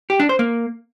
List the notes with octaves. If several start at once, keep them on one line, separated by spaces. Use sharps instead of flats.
G4
D4
C5
A#3